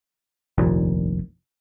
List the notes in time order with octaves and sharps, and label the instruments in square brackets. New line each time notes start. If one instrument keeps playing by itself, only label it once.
[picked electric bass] F1 A#1 D#2 A#2